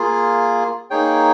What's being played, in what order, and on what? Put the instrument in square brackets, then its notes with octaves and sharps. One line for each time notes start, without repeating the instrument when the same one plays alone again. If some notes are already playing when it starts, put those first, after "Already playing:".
Already playing: [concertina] A#3 F4 G#4
A#3 D#4 G#4 C#5 G5